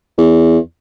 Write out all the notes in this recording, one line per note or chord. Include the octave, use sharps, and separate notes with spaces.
E2